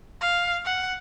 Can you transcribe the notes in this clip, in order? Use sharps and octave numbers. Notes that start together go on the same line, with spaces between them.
F5
F#5